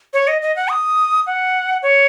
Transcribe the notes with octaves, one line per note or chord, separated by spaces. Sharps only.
C#5
D#5
D#5
F#5
D#6
F#5
C#5